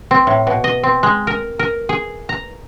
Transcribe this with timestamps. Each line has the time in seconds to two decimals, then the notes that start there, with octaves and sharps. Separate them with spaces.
0.11 C4
0.27 A2
0.47 B2
0.64 D#5
0.83 C4
1.03 G#3
1.27 A#4
1.59 A#4
1.89 G#4
2.29 A#5